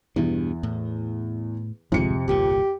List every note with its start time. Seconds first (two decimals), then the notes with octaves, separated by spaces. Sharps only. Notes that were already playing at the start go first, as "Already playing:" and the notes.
0.16 E2 G2 B2
0.63 A2
1.92 D1 G#1 F2 C3 G#3 C#7
2.28 G1 C2 A#2 G4